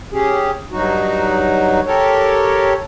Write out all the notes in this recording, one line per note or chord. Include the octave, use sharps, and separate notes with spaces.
C#4 G4 G#4
G2 F#3 D#4 F#4
G4 A4 A#4 C#5